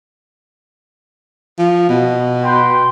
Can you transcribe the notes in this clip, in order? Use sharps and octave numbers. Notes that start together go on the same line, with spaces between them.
F3
B2
B4 G5 C6